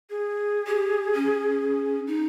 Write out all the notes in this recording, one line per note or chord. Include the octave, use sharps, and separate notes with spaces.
G#4
G4
C#4
D#4